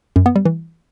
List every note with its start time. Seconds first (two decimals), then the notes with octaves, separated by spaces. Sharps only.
0.16 F#2
0.26 B3
0.36 G3
0.45 E3